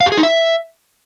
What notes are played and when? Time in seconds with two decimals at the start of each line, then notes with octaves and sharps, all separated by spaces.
0.01 F5
0.06 G4
0.12 G#4
0.18 D#4
0.23 E5